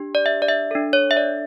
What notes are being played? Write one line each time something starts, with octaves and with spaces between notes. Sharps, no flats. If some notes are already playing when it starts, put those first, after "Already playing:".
Already playing: D4 G4
D5
E5
D5
E5
D4 A4
C#5
E5
D5